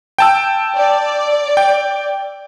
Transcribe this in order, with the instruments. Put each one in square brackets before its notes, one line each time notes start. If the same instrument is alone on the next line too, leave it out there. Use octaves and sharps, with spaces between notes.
[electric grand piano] G5 A5 E6
[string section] D5
[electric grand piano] G5